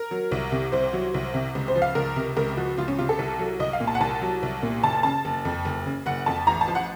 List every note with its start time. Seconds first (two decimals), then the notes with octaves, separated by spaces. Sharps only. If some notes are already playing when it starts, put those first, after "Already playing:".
Already playing: A#4
0.11 F#3
0.31 C2
0.52 C3
0.72 C2 C5
0.93 F#3
1.14 C2
1.34 C3
1.55 C#2
1.68 C5
1.76 F3
1.82 F5
1.95 C#2 A#4
2.16 C3
2.37 C#2 A#4
2.57 F3 F#4
2.77 C#2 F4
2.88 C#4
2.99 C3 F4
3.09 A4
3.19 C2
3.39 F#3
3.59 C2 D#5
3.73 F5
3.80 A#2
3.87 A5
3.95 F#5
4.00 C2 A5
4.22 F#3
4.43 C2
4.63 A#2
4.83 F#1 A5
5.03 C#3 A5
5.25 F#1
5.45 F2
5.65 F#1
5.86 C#3
6.06 F#1 F#5
6.26 F2 A5
6.47 A1 A#5
6.61 A5
6.68 F3
6.75 F#5